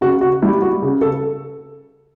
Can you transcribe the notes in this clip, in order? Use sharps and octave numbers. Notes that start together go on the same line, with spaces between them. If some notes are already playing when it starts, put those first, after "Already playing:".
C#3 F#4
F#4
G3 E4
F#4
C#3
A4